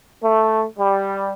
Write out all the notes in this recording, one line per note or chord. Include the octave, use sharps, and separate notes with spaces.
A3
G3